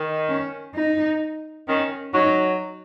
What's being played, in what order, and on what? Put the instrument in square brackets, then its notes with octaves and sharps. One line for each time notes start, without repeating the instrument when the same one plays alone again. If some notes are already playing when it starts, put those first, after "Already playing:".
Already playing: [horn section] D#3
[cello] C#4
D#4
[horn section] D#3 [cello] C#4
[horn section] F#3 [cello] D#4